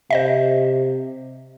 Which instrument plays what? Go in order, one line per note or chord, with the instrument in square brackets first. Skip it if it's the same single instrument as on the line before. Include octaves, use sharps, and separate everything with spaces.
[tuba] C3 [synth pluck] C5 D#5 E5